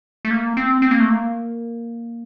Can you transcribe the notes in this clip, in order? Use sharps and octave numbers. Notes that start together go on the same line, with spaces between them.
A3
A#3
C4
C4
A#3
A3
A#3